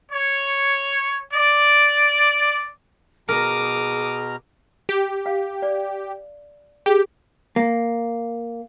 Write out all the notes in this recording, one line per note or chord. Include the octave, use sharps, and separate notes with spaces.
C#5
D5
B2 G#4 A#4 A#5 D6 D#6 F6
G4
F5
D5
G4 G#4
A#3